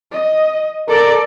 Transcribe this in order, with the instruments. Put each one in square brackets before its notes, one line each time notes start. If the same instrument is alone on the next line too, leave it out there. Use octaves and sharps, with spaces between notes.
[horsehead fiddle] D#5
[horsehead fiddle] A4 D5 [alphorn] A#4